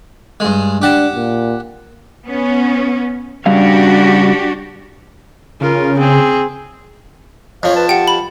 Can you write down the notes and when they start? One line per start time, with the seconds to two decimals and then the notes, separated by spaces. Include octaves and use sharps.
0.40 G2 G#3
0.82 D4 G4 F#5 A5
1.15 A#2
2.26 B3 C#4
3.46 C#3 G3 D4 F#4 G4 F5
5.61 C#3 F4 A#4
5.97 C4 G#4
7.63 F2 F3 C#5 F5
7.76 B4 A5
7.89 G4 F#5 G5
8.08 B5